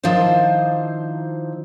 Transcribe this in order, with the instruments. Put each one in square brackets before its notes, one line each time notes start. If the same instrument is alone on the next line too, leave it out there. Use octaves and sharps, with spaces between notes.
[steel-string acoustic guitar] D#3 F3 D4 E4 C5